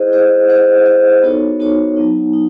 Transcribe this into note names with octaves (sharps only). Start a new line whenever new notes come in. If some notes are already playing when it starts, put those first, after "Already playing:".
Already playing: E4 G#4 C5 D#5
E4 G#4 C5 D#5
E4 G#4 C5 D#5 F#5
E4 G#4 C5 D#5 F#5
B3 D#4 F#4 A4 C#5
B3 D#4 F#4 A4 C#5
F#3 B3 D#4
D#4